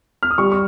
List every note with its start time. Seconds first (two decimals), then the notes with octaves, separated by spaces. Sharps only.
0.23 F6
0.31 D#6
0.38 G3 C#6
0.52 C#6